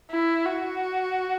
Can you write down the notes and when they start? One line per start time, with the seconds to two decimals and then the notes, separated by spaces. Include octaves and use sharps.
0.11 E4
0.46 F#4